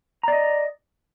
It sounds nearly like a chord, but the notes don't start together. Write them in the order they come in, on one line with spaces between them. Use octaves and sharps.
A#5 D5 D#5